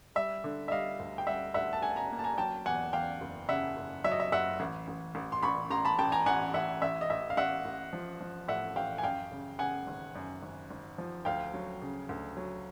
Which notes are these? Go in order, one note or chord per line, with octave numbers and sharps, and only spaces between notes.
G3 E5
D3
E5
G3 D#5 F5
D2
G5
G3 E5 F#5
D2 E5 F#5
A5
D2 F#5 G#5
A5
G#5 A#5
A#3
A5
G#5 A#5
F#3 G5 A5
E2 F#5 G#5
E2 F5 G5
F#1
C#3 E5 F#5
F#1
F#3 E5
D#5
E5
F#1 E5 F#5
A1
A1
A1
C6
A1 B5 C#6
A1 A#5 C6
A5 B5
A1 G5 A5
G#5 A#5
A1 F#5 G#5
A1 E5 F#5
A1 E5
D#5
A1 E5
F5
A1 E5 F#5
A1
F3
F3
A2 E5 F#5
A1 F5 G5
G#5
F#2 F5 G5
C#3
C#3 F#5 G#5
G#1
F#2
G#1
G#1
F3
D2 F5 G5
F#3
C#3
D2
F#3